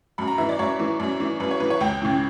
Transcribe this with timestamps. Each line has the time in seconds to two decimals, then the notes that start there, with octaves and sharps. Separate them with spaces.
0.18 F#2 B5
0.28 A#5
0.38 E3 E5
0.49 D5
0.59 F#2 C#5
0.80 E3
1.00 F#2
1.20 E3
1.40 F#2 B4
1.51 C#5
1.60 E3 B4
1.70 C#5
1.80 C#2 G5
2.02 C#3 E3